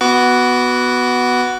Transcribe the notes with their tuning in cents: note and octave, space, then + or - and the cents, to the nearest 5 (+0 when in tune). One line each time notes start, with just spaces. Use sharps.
B3 +0 F#4 +0 D6 -40